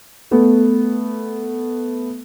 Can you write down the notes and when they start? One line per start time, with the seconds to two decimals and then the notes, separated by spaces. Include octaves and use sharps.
0.31 A3 B3